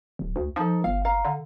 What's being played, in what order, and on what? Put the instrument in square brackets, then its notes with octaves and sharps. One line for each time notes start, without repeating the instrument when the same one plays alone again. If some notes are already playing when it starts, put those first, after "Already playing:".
[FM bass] D1
D2
[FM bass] F3 [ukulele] D#4 A4
[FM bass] G1 [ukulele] F5
[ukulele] F5 A#5
[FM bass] D3